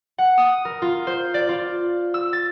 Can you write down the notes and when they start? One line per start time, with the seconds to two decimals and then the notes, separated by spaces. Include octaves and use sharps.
0.18 F#5
0.38 D#6
0.65 A#4
0.82 F4
1.07 C5
1.34 D5
1.49 F4
2.14 E6
2.33 A6